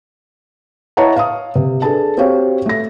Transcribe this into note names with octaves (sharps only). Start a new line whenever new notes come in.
E4 C#5 D#5 F#5 A5 A#5
F5 D#6
C3
D4 G#4 A4 B4 A5
C4 F#4 G4 C#5 F5 G5
A3 A#6